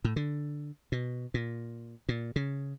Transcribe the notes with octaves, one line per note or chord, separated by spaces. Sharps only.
A2
D3
B2
A#2
A#2
C#3